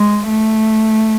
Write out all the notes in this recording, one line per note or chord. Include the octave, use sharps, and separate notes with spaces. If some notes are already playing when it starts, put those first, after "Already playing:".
Already playing: G#3
A3